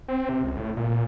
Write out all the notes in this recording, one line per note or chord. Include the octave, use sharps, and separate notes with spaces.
C4
C3
C#2
A2
A#2
A#2